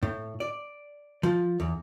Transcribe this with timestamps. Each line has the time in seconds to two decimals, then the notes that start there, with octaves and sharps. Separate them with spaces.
0.03 A2
0.40 D5
1.23 F3
1.60 E2